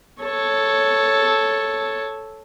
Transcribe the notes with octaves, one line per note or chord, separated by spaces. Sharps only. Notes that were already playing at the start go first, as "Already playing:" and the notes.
A4 C#5